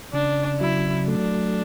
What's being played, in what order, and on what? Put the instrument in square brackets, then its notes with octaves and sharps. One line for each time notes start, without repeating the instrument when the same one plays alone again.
[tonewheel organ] C#3 [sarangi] D4
[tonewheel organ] F#3 [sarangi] E4
[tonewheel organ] A3 [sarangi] D4